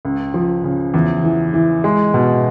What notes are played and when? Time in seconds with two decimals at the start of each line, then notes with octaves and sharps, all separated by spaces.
0.05 C#2
0.34 F3
0.64 C#3
0.94 E2
1.23 E3
1.54 E3
1.84 G#3
2.14 B2